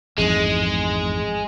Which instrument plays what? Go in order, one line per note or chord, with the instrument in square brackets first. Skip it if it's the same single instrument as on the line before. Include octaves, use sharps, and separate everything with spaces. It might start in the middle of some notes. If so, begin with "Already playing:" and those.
[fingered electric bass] A1 F2 G#2 [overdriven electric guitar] G#3